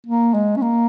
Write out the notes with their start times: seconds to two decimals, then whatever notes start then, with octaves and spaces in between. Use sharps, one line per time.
0.07 A#3
0.34 G#3
0.56 C#4
0.62 A#3